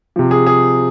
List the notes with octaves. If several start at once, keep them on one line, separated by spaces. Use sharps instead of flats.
C3 F3
G#4
G#4